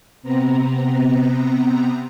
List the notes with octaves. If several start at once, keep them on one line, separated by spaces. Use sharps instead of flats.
C3 B3 C4 A#5